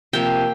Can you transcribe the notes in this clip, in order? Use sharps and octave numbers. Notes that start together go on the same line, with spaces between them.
C3 F3 A#3 G5